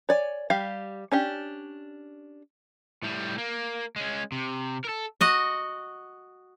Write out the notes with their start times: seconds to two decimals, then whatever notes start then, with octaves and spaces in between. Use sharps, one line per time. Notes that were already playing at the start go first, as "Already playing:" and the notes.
0.09 C#5 D5 G#5
0.50 G3 G4 F5
1.12 C#4 D4 G4
3.03 A2 G3
3.38 A#3
3.96 G#3 C#4
4.32 C3
4.84 A4 A#4
5.21 F#4 D#5 F#5